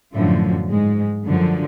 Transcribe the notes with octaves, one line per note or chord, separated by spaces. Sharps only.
F#2 A2 D3 F3 A3
G#2 G#3
F#2 D3 F3